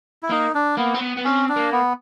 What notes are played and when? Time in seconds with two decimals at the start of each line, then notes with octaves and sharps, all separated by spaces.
0.23 E4
0.31 A#3 D#4
0.55 D4
0.77 A#3 B3
0.95 C4
1.01 B3
1.17 B3
1.25 C4 C#4
1.49 D4
1.56 A#3
1.72 B3